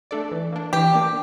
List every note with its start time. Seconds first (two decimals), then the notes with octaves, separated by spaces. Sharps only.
0.11 A3 D4 A4 D5
0.32 E3
0.53 A#3 D4
0.73 E3 G4
0.94 A#3 D4